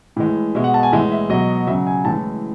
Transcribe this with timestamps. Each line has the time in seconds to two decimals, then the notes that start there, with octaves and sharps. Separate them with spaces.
0.16 A2 E3 G#3
0.55 B2 G#3 E5
0.64 F#5
0.74 A5
0.83 G#5
0.92 A2 E3 G#3 E5
1.12 E5
1.29 B2 F#3 D#5
1.67 C#3 F#3 E5
1.87 G#5
2.05 A2 E3 G#3 A5